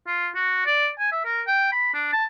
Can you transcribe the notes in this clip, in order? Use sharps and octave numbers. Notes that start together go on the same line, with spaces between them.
F4
F#4
D5
G#5
E5
A#4
G5
B5
D4
A5